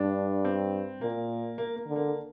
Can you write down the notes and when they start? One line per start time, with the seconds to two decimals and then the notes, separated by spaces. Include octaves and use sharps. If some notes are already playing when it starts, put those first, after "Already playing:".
Already playing: G2 D4
0.45 C4
1.01 A#2 A#3
1.58 A#3
1.76 A#3
1.86 D3
1.96 A#3